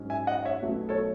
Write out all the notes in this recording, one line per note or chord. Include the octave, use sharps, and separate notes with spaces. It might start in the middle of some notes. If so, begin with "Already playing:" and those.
Already playing: G#2 F#3 C#4
E5 G#5
D#5 F#5
C#5 E5
B1 B2 F#3 A3
A4 C#5